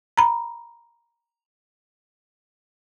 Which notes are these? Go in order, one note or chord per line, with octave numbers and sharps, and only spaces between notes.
A#5 B5